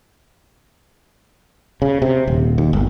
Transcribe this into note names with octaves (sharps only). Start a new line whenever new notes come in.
C#3
C3
D#1
D#2
G1